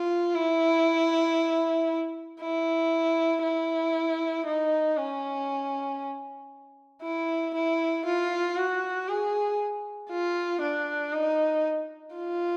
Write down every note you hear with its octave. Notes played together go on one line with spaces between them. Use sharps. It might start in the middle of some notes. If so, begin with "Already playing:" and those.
Already playing: F4
E4
E4
E4
D#4
C#4
E4
E4
F4
F#4
G#4
F4
D4
D#4
F4